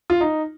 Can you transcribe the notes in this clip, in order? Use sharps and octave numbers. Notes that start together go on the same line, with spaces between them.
F4
D#4